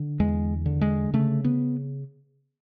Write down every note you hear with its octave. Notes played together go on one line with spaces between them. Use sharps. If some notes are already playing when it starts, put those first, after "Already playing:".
Already playing: D3
E2 G#3
D3
G#3
C#3 A3
B3